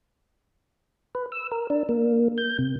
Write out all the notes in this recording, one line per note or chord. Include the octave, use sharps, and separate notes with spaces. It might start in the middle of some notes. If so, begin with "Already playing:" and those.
B4
E6
A#4
D4
A#3
G6
C3